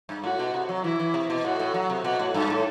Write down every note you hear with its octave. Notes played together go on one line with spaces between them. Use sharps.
G2
A2 F#4
B2
C3
F#3
E3 E4
E3
C3
B2
A2 F#4
A2
F#3
C3
B2 F#4
A2
G2 A4
A2